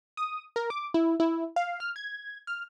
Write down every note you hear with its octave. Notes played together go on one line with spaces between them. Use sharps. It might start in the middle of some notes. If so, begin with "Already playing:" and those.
D#6
A#4
D6
E4
E4
F5
F6
G#6
F6